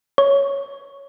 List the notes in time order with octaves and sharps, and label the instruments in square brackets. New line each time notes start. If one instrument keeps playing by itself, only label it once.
[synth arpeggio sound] C#5